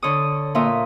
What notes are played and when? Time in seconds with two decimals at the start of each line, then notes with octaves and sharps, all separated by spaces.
0.03 D3 C#5 D#6
0.55 A#2 F4 E5 D#6